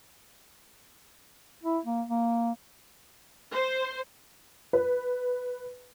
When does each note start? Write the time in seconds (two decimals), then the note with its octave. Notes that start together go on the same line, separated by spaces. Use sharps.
1.63 E4
1.85 A#3
2.07 A#3
3.52 C5
4.73 B4